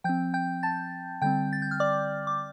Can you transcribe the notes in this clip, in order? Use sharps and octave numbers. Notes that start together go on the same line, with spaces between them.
F3 C4 G5 G6
G5 G6
A5 A6
D3 G3 C4 G5 G6
A6
G6
F6
D5 D6
D6